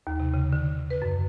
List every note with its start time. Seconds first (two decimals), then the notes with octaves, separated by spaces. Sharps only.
0.07 D#2
0.20 C3
0.34 C#3
0.53 D3
0.90 B4
1.02 F#2